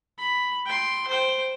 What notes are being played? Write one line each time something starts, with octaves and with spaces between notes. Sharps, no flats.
B5
G5 C6
C5 G5